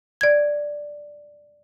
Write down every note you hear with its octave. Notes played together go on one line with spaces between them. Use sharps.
D5 G#6